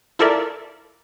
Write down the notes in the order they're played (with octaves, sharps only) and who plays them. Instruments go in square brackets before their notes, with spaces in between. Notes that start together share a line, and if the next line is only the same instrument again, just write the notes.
[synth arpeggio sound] E4 F4 A4 A#4 D5 E5